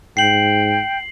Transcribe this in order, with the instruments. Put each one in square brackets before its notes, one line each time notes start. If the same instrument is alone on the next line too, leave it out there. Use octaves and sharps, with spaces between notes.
[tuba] G#2 [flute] G5 [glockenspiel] C7 F#7